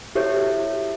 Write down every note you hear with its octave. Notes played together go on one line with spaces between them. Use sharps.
E4 F#4 G4 A4 C#5 E5